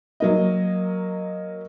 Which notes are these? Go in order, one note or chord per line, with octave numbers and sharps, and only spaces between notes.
F#3 A#3 D#5